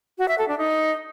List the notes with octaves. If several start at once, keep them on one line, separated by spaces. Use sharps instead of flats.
F#4
E5
A4
D4
D#4